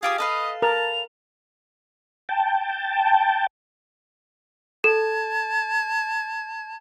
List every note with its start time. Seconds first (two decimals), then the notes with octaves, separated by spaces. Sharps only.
0.03 F4 G4 G#4 D#6 F6
0.18 A4 B4 D#5 F5
0.62 A#4 A5 F7
2.29 G5 A5
4.84 A4 A5 G#6